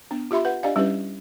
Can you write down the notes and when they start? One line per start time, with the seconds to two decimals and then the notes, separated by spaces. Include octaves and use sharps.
0.11 B3 D4
0.31 F4 G4 E5 B5 C6
0.45 B4 F#5
0.63 D4 G4 D5 D#5 F5 G#5
0.76 G3 C#4 D4 E4 G4 B4